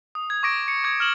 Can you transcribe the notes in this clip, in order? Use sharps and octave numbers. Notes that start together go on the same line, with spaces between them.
D#6
G#6
C#6 D6 A#6 D7
C#7
D6 G#6
F6 E7 F#7